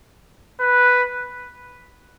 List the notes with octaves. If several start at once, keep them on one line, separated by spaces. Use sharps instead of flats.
B4